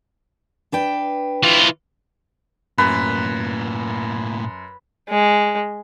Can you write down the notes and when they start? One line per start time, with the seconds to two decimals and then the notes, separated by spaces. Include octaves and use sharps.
0.72 D4 B4 G5
1.43 E3 F4
2.78 F#2 A2 A#3 B4
5.09 G#3